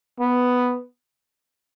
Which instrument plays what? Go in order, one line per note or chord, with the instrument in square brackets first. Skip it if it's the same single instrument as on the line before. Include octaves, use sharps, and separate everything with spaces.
[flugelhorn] B3